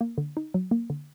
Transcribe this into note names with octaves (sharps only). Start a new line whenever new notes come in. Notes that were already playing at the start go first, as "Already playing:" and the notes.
A#3
D3
D#4
F#3
A#3
D3